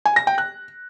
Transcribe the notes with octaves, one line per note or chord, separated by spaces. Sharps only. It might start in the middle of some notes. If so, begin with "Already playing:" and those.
G#5
A#6
G5
F#6